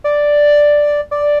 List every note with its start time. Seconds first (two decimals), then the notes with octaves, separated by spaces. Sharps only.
0.04 D5
1.11 D5